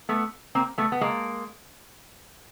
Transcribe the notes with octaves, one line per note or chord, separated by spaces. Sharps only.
A3 B3
A#3 C4
A3 B3
B3
G#3 A#3